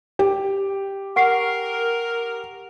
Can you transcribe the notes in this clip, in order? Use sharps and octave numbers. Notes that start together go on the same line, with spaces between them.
G4
A#4 F#5 C#6 C7